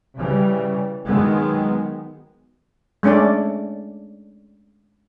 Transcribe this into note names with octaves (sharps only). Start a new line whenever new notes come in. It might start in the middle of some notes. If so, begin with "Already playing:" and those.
C#3 E3 G3
D#3 F#3 G#3 B3
G#3 A3 C#4 D4 D5